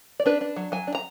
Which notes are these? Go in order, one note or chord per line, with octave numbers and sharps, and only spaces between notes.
D5
D4 B4
D4
F#3
F#3 G#5
D4
A#5